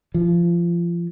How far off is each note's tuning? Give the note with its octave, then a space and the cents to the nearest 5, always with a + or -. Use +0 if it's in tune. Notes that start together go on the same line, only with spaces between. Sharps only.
F3 -25